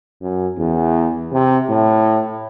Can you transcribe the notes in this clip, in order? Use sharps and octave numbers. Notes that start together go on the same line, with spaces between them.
F#2
E2
C3
A2